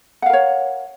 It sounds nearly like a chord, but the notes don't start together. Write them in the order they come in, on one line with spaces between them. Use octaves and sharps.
F#5 F5 A#4 C#5